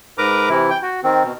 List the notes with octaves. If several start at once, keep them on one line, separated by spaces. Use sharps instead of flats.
G#2 A#4 B4 A#5 D6
C3 E3 E4
G5
F#4
D#3 C4
B2